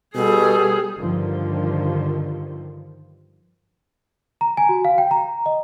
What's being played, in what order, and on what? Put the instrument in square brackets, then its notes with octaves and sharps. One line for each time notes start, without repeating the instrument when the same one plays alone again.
[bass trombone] B2 [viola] G3 G#4 [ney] A4
[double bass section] G2 D3 D#3 F3
[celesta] A#5
G#5
F#4
F5
G5
A#5
D#5